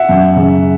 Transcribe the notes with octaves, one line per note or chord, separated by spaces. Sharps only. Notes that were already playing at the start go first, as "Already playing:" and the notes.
Already playing: E5 F#5
F#2
C#3